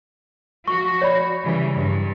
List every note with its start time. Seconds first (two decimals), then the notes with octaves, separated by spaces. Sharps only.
0.68 F3 F#4 C#6
1.02 C#5 D5 B5
1.44 C#3 E3 G3
1.76 G2